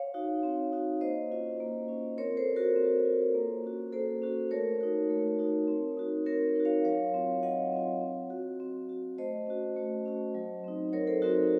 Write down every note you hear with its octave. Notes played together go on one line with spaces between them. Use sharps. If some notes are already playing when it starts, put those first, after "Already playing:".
Already playing: C#5 F5
D#4 F#4
C4
D#4 F#4
A#3 C5 D#5
C#4 F4
A#3
C#4 F4
C4 A#4 C#5
A4 C5
F4
F#4 A#4
C4
F4
A#3
C#4 F#4
A#3 A4 C5
C#4 F#4
A3 A#4 C#5
D#4 F#4
A3
D#4 F#4
C4
D#4 F#4
C4 A#4 C#5
D#4 F#4
C#5 F5
F#3 C#5 F5
C4 F4
F#3 D#5 F#5
C4 F4
C4
F#4
C4
F#4
A3 C5 D#5
C#4 F#4
A3
C#4 F#4
F#3
C4 D#4
F#3 A#4 C#5
A4 C5
C4 D#4 F#4 A#4